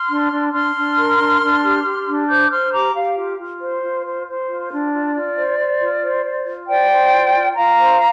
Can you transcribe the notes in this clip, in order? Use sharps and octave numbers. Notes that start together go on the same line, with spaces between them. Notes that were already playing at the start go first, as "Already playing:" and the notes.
Already playing: C6 F6
D4
D4
D4 C6 F6
D4
A#4
D4
D4
G4
G4
D4
C5 D6 G6
C5 C6 F6
G4 A#5 D6
G4 F5
F4
F4
C5
F4
C5
C5
F4
D4
F4 D5
F4
C5
C5
F4
C5
C5
F4
C5 D5 G5
C5
F4
F4
F4 F5 A#5
C5